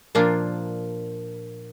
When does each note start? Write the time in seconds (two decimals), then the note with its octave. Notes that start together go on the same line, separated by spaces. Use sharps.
0.15 A#2 F3 A#3 D4 F4